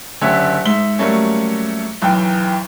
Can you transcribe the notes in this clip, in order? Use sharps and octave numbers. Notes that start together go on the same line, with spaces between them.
F#1 D3 C#4 G4 C#5 E5
G#2 E5 G7
F#3 G3 A3 A#3 C#4
B1 F#2 E3 G5